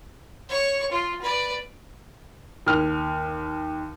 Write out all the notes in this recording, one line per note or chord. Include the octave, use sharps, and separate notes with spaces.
C#5 C#6
F4
B4 D5
D#2 F6